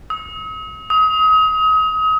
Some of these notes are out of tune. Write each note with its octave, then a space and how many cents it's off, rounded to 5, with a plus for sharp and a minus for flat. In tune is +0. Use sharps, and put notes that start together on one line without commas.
D#6 +45
D#6 +35